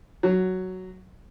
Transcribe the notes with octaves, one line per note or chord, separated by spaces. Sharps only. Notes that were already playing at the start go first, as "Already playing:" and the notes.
F#3